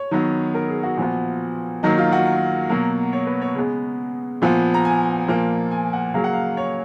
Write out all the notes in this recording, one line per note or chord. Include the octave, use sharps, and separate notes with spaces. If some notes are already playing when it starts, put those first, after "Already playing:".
Already playing: C#5
D#3 F#3 B3
A#4
G#4
F#4
A#2 F3 B3
D#3 F#3 A#3 D#4
F4
F#4
B2 F#3 A#3
C#5
B4
C#5
C#3 G#3 B3
A#2 F3 B3
A#5
G#5
A#2 F3 A#3
G#5
F#5
C#3 F#3 A#3 F5
F#5
F5
C#5